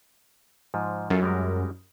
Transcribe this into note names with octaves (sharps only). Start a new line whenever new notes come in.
G#2 F3
F#2 F4 A4
G3 G#3 A#4